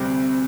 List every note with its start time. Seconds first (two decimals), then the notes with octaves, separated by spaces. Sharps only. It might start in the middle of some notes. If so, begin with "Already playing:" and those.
Already playing: D2 C3 G3 C4